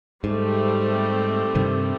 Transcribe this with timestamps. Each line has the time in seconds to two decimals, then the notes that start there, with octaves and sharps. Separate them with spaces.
0.24 G#2 G3 A3 C4
1.55 G2 C3 D#3